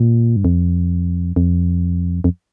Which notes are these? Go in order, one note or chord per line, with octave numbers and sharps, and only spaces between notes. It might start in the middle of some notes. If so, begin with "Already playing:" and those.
Already playing: A#2
G2
F2
F2
F2